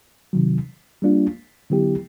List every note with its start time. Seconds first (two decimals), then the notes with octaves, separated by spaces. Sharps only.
0.33 C3 D#3 F#3
1.02 G3 A#3 D4 F4
1.70 D3 F#3 B3 E4 G4